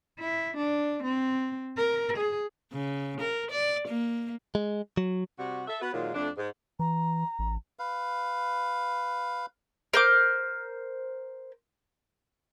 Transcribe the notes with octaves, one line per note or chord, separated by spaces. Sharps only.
E4
D4
C4
A#4
G#4
C#3
A#4
D5
A#3
G#3
F#3
C3 G3 F#4
A4 E5
B3 F#4 B4
A#2 D#3 F#3 G#3 F4
F2 A3 D4
G#2
E3 A#5
A1
B4 F5
A#4 C5 D6